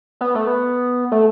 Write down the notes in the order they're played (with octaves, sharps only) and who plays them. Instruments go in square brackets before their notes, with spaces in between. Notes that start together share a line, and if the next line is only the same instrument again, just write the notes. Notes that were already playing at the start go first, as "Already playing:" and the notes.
[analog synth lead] B3
A3
B3
A3